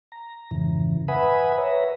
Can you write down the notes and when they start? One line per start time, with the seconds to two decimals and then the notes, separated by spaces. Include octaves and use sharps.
0.12 A#5
0.51 F2 G#2 C#3 E3
1.08 B4 E5 F#5 G#5 B5 D#6
1.58 B4 C#5 E5 A#5